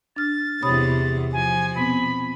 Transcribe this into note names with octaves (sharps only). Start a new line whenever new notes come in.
D4 F6 A6
E2 C3 C#5 B5 D#6
F3 G#5
B2 B3 C4 B5